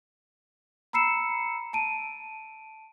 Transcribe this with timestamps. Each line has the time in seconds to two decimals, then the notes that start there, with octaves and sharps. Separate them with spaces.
0.93 A#5 B5 E6 C7 C#7 E7
1.73 A5 D7 D#7